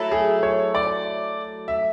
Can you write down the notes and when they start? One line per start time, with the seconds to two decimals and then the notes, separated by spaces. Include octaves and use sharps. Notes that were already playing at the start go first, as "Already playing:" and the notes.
Already playing: F#3 A3 E4 A4
0.11 G#4
0.43 C#5
0.75 D5
1.68 E5